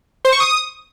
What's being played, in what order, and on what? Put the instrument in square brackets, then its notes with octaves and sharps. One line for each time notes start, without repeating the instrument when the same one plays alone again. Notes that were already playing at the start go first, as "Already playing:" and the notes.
[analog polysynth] C5
C#6
D#6